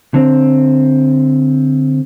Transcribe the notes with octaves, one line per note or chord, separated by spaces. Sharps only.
D3 C4